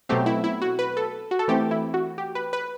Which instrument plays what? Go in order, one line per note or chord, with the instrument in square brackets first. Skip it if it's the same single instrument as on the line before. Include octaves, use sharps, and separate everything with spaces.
[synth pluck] B2 F#3 A3 C4 G4
E4
E4
F#4
B4
A4
F#4
A4
E3 A3 C4 G4
E4
F#4
G4
B4
B4